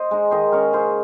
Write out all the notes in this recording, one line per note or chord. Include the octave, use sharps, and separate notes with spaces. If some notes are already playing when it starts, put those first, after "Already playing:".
Already playing: C5 D#5
G#3 D#4
D#3 C5 D#5
G#3 C#4 A#4 C#5
C#3 G#4 C5